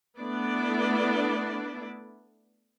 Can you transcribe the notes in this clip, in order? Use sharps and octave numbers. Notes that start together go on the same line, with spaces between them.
A3 B3 D4 E4 D5